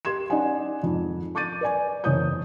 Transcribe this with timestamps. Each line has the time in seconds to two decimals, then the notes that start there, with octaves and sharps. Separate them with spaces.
0.05 G4 C6 G#6 E7
0.30 C#4 D#4 D5 D#5 F#5 G#5
0.83 F2 G#2
1.35 C#6 D6 G6 A6 D#7
1.61 B4 D5 G#5
2.04 F#1 E2 C#5 D#6 G6